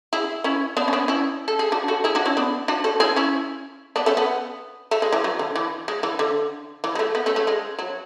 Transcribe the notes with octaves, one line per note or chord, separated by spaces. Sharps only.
E4 G#4
C#4 E4
B3 D4
C#4
B3 D4
C#4 E4
A4
G#4
D4 F#4
F#4 A4
E4 G#4
D4 F#4
C#4 E4
B3 D4
D4 F#4
F#4 A4
E4 G#4
C#4 E4
B3 D4
A3 C#4
B3
A3
G#3
E3
F#3
D3
E3
G#3
E3
D3
E3
G#3
A3
B3
A3 C#4
A3
G#3
F#3